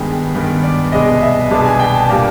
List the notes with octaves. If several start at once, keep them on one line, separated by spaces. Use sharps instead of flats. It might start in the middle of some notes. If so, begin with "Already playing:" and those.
Already playing: G2 D#3 G#3 B3 G5
G2 D#3 G#3 B3
D5
C2 B2 G#3 B3 D4 D#5
E5
C2 B2 G#3 B3 D4 A5
G#5
G5
A5
A#2 G3 A#3 D4